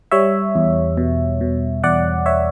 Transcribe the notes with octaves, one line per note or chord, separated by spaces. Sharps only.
G3 C#5 E5
E2
B2
B2
E2 D5 F#5
C#5 E5